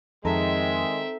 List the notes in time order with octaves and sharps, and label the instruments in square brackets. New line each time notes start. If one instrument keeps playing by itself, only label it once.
[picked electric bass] F2 [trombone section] D#3 G#3 [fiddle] C4 E5 [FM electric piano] D#4 A4 A#5